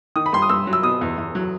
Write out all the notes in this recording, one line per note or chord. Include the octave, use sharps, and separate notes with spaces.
D#3 D#6
B5
G2 C6
D#6
G2 E6
F#3
E6
B2 D#6
E2
E2
F#3